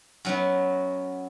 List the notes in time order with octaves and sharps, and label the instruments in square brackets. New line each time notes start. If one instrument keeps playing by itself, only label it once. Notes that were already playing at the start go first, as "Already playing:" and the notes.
[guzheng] F#2 F#3 B3